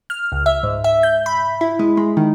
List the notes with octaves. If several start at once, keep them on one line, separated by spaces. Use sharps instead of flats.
F6
C#2
E5
G#2
E5
G6
B5
E4
G#3
G#3
D#3